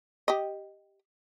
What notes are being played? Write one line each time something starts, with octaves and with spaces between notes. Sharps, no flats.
G4 D#5